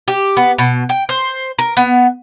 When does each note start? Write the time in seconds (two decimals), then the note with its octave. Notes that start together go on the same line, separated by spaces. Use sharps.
0.08 G4
0.37 B3
0.58 B2
0.89 G5
1.09 C5
1.58 A#4
1.77 B3